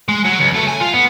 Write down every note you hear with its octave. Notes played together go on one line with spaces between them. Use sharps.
G#3
F#3
C#2
A3
G#5
F4
B3